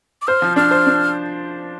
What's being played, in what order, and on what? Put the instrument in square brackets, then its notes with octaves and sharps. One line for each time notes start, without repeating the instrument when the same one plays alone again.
[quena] D6
[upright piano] C5 [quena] F6
[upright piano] F3
[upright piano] D4 [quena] F6
[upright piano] C5
D4